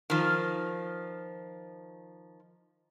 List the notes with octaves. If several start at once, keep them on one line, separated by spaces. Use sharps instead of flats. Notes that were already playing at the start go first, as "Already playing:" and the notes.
D#3 F3